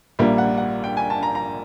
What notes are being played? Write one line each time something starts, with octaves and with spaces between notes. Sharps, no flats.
A#1 A#2 G3 A#3 E5
F#5
F#5
G5
G#5
A5
A#5
A#5